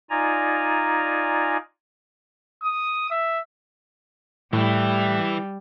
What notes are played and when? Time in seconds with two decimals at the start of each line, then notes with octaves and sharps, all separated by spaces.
0.10 D#4 F4 D5 G#5 A#5
2.63 D#6
3.10 E5
4.53 A2 E3 G3 E4